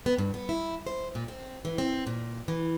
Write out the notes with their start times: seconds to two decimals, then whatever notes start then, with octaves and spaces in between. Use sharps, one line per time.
0.06 B3
0.18 G2
0.34 B3
0.49 E4
0.87 C5
1.15 A#2
1.28 C4
1.65 E3
1.78 C4
2.07 A#2
2.48 E3